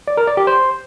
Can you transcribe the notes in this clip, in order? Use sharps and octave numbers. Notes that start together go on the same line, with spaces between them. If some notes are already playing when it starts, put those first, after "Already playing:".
D5
A#4
D5
G4
C5